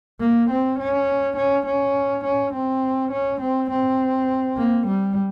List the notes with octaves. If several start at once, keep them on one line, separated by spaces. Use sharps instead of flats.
A#3
C4
C#4
C#4
C#4
C#4
C4
C#4
C4
C4
A#3
G3